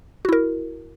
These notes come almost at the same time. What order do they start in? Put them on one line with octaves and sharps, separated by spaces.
F#4 E4 A#4